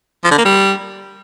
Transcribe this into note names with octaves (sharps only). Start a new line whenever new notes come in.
F3
D3
A#3
G3